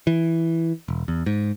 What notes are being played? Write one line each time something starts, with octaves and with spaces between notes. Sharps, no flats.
E3
E1
E2
G#2